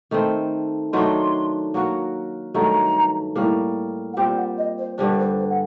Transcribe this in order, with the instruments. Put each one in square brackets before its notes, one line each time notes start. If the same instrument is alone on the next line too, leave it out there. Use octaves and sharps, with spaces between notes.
[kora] D#3 A3 C4
[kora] D#3 F#3 A3 D4 [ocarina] C6
[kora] F#3 A#3 F#4
[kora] G2 D#3 F#3 A3 [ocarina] A#5
[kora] A2 G3 A#3
[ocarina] F#5
[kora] A#2 G3 C4 G4 [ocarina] G5
[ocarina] F#5
D#5
C5
[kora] G2 D3 G3 D4 [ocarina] C5
[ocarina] A#4
C5
C5
F#5